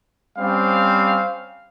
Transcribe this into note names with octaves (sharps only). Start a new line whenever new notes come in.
G3 C4 C#4 F5